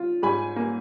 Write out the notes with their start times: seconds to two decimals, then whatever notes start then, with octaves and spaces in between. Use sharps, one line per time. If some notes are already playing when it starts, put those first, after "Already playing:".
Already playing: F4
0.23 G#2 G#5 B5
0.56 A#3